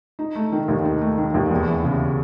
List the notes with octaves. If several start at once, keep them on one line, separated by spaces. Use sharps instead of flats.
D#4
A3
D#3
D#2
D#4
A3
D#3
D#2
E2
E3
C#3